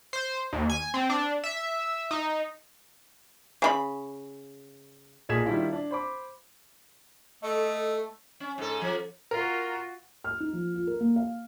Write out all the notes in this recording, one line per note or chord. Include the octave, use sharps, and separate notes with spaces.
C5
D#2
G#5
C4
D4
E5
D#4
C#3 F4 B5
B1 A#2 G#4 G#6 B6 E7
D#3 G3 D4 E4 F4
D4
C5 B5 D6
A3 A4 D#5
C#4
G#2 A4
F3
F4 F#4 A#4
F6
D#4
F3
F4
A#4
A#3
F5